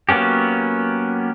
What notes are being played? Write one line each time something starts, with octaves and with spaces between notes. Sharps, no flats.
F#3 A#3 B3 C#4 G4